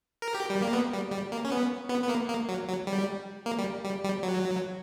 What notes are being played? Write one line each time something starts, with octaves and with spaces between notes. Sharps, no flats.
A#4
G4
G3
A#3
B3
G3
G3
A#3
C#4
B3
B3
B3
A#3
A#3
F#3
F#3
G3
A#3
G3
G3
G3
F#3